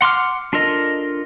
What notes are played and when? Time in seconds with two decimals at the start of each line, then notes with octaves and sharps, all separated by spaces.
0.01 F#5 C6 D6 F6
0.53 D4 F4 A4 A#4 D#5